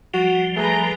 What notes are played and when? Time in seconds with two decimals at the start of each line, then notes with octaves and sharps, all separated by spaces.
0.14 F3 G3 F#4
0.56 A3 G#4 B4 A#5